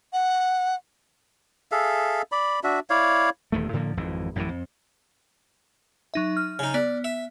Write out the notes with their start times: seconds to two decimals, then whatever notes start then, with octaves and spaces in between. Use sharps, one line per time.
0.13 F#5
1.72 G#4 A4 E5 F5
2.32 D5 B5
2.64 D4 F#4 E5
2.90 E4 C#5 D5 F5
3.52 D#1 E2 D#3 A3
3.73 A2 D3 F3 A#3
3.97 G#1 F2 E3
4.36 A1 F#2 A2 E3
4.49 F2
6.14 F#3 D#4 E5
6.37 F6
6.59 C#3 D#4
6.74 B3 D5
7.04 E5